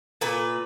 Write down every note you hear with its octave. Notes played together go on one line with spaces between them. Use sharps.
A#2 B4